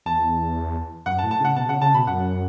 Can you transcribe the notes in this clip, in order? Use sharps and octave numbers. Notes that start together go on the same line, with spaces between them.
E2 A5
F#2 F#5
A5
A2
A5
C#3 F#5
B2 A5
C#3 F#5
C#3 A5
B2 B5
F#2 F#5